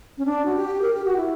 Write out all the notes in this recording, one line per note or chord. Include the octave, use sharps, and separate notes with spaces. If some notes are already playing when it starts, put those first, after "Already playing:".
C#4
D4
F#4
G4
A#4
G4
F#4
E4